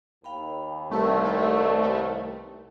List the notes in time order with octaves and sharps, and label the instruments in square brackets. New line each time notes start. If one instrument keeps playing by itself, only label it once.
[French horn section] D#2 [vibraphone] F5 G5 B5
[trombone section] C2 [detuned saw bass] A3 [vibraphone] G4 B4 D5